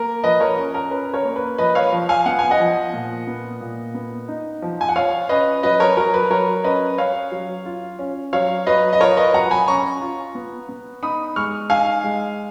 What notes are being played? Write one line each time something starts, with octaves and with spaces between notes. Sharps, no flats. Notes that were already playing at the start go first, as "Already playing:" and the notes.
Already playing: A#3 A#4
F3 B4 D#5
A#4 C#5
C#4
A#4
C#4 B4
A#4 C#5
A#3
B4
F3 B4 D#5
C#5 F5
F3
F5 G#5
B3 F#5
G#5
D#5 F#5
F3
A#2
B3
A#2
B3
D#4
F3
G#5
F#5
F4 C#5 F5
C#4 B4 D#5
F#3 B4 D#5
A#4 C#5
F#3 A#4
B4
F#3 A#4 C#5
C#4 B4 D#5
C#4 C#5 F5
F#3
F4
C#4
F#3 C#5 F5
F#3 B4 D#5
D#5
F4 A#4 C#5
B4 D#5
F#3 F#5 A#5
G#5 B5
C#4 A#5 C#6
F4
B3
B3
D#4 B5 D#6
G#3 C#6 F6
D#4 F5 G#5
G#3